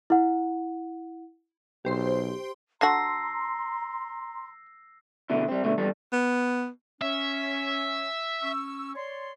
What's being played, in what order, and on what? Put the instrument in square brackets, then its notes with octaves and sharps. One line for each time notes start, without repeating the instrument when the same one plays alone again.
[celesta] E4 F#5
[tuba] B1 [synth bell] G4 C5 C6
[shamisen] D3 F#4 [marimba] A5 [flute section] A#5 C6 [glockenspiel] E6 A#6 C7
[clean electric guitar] B2 D3 E4
G3 C4
B2 D3 A3
E2 G2 G3 A4
[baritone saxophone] B3
[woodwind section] C#4 [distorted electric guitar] E5
[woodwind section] C#4 C#6 E6
C#5 D5 C6